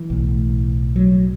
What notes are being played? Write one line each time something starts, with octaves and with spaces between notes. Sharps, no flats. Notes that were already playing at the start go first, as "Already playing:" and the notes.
Already playing: E3
B1 A2
F#3